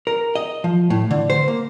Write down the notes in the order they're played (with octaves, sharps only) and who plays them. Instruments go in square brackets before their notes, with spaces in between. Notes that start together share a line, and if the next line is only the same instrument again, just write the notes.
[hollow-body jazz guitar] A#4
D#5
F3
A2
D3
C5
A#3